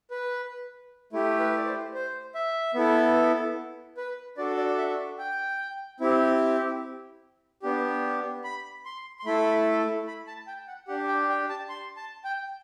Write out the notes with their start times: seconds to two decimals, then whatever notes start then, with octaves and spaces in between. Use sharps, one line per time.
0.11 B4
1.13 A3 E4 G4
1.39 B4
1.58 D5
1.66 C5
1.94 C5
2.35 E5
2.74 B3 E4 A4
3.97 B4
4.37 D4 F#4 A4 D5
4.57 D5
4.78 E5
5.18 G5
6.00 C4 E4 G4
7.62 B3 D4 G4
8.44 B5
8.85 C6
9.19 C6
9.25 A3 E4 A4 B5
10.07 B5
10.27 A5
10.47 G5
10.67 F#5
10.88 D4 G4 F#5
11.08 G5
11.29 G5
11.49 A5
11.69 C6
11.97 A5
12.24 G5